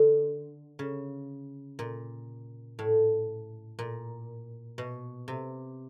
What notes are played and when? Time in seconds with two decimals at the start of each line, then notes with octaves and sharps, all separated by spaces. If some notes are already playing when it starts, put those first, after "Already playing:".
Already playing: D3
0.79 C#3
1.79 A#2
2.79 A2
3.79 A#2
4.78 B2
5.28 C3